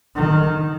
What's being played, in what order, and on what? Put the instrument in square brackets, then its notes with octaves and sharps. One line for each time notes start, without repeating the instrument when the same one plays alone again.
[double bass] D#3